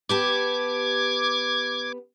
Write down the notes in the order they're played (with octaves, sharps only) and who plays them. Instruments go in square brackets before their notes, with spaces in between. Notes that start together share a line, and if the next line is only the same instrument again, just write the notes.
[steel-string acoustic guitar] B3 G4 A5 [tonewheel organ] D6 G#6